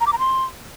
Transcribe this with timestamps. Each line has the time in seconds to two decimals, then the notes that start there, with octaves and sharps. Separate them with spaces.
0.01 A#5
0.07 D6
0.13 A#5
0.19 C6